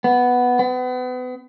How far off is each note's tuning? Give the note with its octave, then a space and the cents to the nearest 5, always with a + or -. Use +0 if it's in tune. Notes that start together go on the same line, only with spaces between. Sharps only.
B3 +0
B3 +35